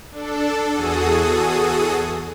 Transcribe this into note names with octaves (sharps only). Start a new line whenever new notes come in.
D4 A4
E2 F#4 G#4 A4 D#6